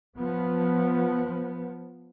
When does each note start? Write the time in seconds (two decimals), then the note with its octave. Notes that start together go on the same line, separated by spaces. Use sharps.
0.17 F3 B3